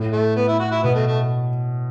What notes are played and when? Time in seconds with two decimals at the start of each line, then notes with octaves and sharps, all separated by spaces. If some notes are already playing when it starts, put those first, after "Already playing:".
Already playing: A2
0.13 A3
0.37 B3
0.48 E4
0.60 F#4
0.71 E4
0.83 B2 B3
0.95 A3
1.07 A3